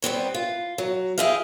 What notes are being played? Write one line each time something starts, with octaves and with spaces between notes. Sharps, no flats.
G3 B3 C4 C#5
F4
F#3
E4 G4 G#4 D#5 F5